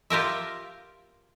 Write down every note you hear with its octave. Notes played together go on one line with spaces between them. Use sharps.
F4 G4 A#4 E5